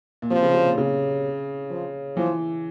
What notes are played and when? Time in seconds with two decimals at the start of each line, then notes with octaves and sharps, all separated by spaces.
0.22 A#2
0.31 C3 F3
0.42 C#3
0.54 C3
0.65 A#2
0.78 C#3
1.70 F3
2.17 E3 F3